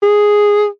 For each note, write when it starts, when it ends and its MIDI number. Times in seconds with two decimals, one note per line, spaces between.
0.02 0.66 68